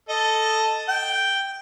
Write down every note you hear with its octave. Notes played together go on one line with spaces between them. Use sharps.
A4 D#5
G5